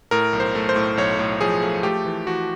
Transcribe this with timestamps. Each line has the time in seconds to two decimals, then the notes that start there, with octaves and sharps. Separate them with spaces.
0.11 A2 A#4
0.33 B1
0.40 C5
0.55 A3
0.69 C5
0.76 A2
0.97 B1 C#5
1.19 A2
1.41 F3 G#4
1.62 A3
1.83 A3 G4
2.05 E3
2.26 E3 F#4